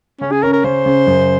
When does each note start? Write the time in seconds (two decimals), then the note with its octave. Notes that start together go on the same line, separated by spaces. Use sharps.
0.21 C#3 C#4
0.32 G#4
0.43 C#4 A#4
0.53 A#4
0.64 C#3 C5
0.86 C#3
1.07 F#2